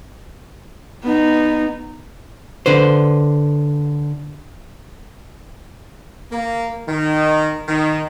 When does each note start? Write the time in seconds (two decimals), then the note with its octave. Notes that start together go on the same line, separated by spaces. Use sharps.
1.03 B3 D#4
2.66 D3 B4 C5
6.32 A#3
6.88 D#3
7.69 D#3